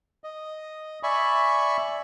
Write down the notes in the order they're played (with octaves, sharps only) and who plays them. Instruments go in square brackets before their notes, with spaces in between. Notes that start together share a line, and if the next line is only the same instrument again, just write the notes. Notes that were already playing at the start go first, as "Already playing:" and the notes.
[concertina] D#5
D5 E5 G#5 B5 C#6